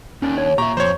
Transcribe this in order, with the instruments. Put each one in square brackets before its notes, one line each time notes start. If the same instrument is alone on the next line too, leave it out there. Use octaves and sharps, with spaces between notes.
[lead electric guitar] D#2 [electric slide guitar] D#3 D4 [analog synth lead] C#4
[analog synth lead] C#5
[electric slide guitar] A#2 [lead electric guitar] G4 E5 [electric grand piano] A#5 [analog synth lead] C#6
[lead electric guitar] F2 [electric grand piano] C5 C#5